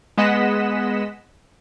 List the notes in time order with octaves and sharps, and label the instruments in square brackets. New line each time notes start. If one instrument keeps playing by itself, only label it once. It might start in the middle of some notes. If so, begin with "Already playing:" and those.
[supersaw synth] G#3 B3 D#5 F#5 B6 E7